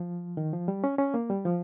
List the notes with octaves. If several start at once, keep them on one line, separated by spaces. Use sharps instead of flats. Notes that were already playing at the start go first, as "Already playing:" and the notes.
Already playing: F3
D#3
F3
G3
C#4
C#4
A#3
G3
F3